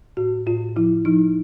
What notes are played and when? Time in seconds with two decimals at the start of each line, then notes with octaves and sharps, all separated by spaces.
0.17 A2 F#4
0.46 A2 F4
0.76 F3 E4
1.05 F3 D#4